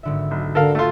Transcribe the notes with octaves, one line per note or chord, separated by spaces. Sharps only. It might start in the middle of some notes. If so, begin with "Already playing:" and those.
G#1 D3 E5
B1
D3 F#4 A4 A#4 F5
A3 F4